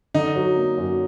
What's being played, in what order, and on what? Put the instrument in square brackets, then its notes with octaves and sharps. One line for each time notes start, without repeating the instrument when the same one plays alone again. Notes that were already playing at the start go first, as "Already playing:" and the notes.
[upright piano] D3 [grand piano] D#4
[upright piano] F#3
A#3
F#2